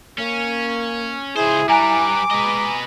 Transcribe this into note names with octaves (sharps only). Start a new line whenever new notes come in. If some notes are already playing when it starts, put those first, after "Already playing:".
A#3 C#4
C#2 E4 G#4 C5
G3 B4 G#5 A#5 D6 D7
G#3 B4 D#5